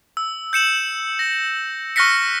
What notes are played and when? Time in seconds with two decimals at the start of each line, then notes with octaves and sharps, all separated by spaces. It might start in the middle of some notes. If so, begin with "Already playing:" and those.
0.17 E6
0.53 G6 C#7 E7 F#7
1.19 A#6
1.96 C#6 F6 F#6 A#6 B6 C#7